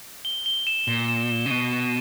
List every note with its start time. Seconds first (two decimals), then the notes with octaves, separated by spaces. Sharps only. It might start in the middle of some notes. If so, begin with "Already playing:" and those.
0.25 G7
0.46 G7
0.67 E7
0.88 A#2 G7
1.08 E7
1.30 E7
1.46 C#3
1.50 B2 D#7
1.72 E7